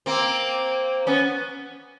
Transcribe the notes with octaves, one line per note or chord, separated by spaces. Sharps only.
A#3 C4
B3 C#4